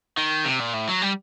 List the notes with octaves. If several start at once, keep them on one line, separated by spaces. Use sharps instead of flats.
D#3
C3
A#2
A2
F#3
G3